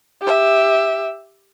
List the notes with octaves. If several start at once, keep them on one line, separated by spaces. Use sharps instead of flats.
G4 E5